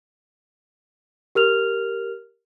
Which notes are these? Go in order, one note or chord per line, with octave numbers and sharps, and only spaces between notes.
G4 A#4 F6 F7